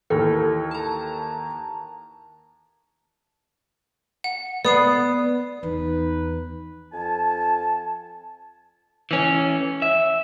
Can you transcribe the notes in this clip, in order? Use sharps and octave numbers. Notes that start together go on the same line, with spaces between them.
D#2 E3 A4 A#4
A5 A#5
F#5
B3 D5 D#6 C7
E2 D#4 B4
F2 G#5 A5
E3 C#4
E5